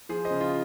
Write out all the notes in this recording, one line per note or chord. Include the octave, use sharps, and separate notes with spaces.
F3 G#4 C5
C5 D#5
C#3
F4